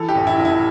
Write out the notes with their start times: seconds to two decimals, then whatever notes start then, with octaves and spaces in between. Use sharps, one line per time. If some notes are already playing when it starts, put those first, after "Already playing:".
Already playing: E3 A4
0.09 G4
0.15 A1
0.27 E4
0.39 A1
0.45 E4